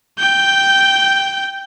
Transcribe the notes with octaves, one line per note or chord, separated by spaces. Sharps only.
G5 G6